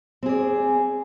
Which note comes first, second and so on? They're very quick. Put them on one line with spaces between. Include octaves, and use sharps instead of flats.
C4 G#4 D5